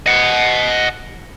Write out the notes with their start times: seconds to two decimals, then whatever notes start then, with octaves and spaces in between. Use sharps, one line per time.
0.06 D#5 F#5